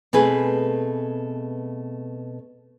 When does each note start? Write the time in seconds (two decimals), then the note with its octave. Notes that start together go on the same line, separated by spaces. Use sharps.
0.13 B2 A3 C4 G#4 B4